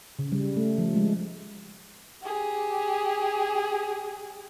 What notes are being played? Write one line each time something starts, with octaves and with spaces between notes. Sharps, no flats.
C#3
G3
A3
F3
G#3
G4 G#4